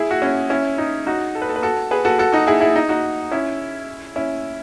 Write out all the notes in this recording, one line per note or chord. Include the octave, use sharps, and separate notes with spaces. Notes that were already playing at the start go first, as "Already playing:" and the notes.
Already playing: E4 G#4
F#4
C#4 E4
C#4 E4
D#4
D#4 F#4
A4
B4
A4
B4
F#4 A4
G#4 B4
F#4 A4
F#4 A4
D#4 F#4
E4 G#4
E4 G#4
D#4
D#4 F#4
C#4 E4
C#4 E4